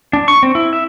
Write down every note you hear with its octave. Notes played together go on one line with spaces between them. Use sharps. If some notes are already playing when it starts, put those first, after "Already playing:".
D4
C#6
C4
E4
E5